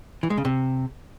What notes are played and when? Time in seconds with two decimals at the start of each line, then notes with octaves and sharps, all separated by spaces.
0.23 E3
0.30 G#3
0.38 C#3
0.45 C3